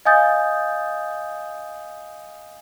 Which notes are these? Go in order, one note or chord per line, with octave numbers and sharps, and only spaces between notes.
D#5 F5 G#5 D#6 G6 A6